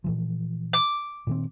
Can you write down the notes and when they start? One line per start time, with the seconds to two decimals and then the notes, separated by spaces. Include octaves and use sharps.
0.04 A#2 E3 F3
0.73 D6
1.27 A#2 D#3 C4